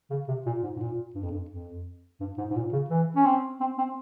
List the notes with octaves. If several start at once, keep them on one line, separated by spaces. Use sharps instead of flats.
C#3
C3
A#2
G#2
G#2
A#2
G2
F2
G2
F2
G2
G#2
G#2
A#2
C#3
E3
C#4
C4
C4
C4